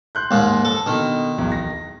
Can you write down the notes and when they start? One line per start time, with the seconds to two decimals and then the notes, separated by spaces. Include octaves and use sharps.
0.15 C6 F#6 G6
0.31 D#2 G#2 F5 C6 F#6
0.65 A4
0.86 B2 D3 D#3
1.38 D1 B1 E2
1.52 A#6